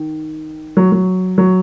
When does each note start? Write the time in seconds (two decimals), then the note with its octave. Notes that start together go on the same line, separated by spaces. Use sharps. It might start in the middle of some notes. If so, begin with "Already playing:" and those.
Already playing: D#3
0.77 F#3
0.92 F#3
1.38 F#3